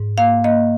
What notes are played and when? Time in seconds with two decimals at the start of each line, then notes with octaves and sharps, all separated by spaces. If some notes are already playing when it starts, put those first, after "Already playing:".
Already playing: G#2
0.18 A#3 F5
0.44 A#3 D#5